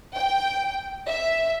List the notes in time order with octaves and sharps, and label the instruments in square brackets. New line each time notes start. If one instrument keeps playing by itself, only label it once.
[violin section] G5
E5